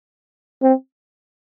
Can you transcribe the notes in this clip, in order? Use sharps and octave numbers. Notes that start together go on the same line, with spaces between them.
C4